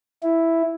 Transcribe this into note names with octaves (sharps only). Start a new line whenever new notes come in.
E4